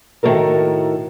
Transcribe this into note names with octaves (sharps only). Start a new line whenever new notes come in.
A2 D#3 A#3 F#4 A4 A#4